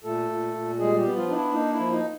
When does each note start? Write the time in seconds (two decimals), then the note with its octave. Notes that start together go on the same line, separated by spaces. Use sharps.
0.04 A#2 A3 A4
0.30 A#2
0.54 A#2
0.79 G3 G#3 G#4
0.97 G3 G4
1.04 B3
1.16 F3 F4
1.28 D4 D#4
1.35 E4
1.53 A#3 D#4
1.72 E4
1.79 F3
1.92 D#4